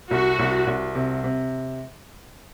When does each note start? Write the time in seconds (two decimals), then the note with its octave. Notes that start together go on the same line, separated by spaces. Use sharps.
0.11 C2 F#4
0.39 C2
0.67 C2
0.95 C3
1.24 C3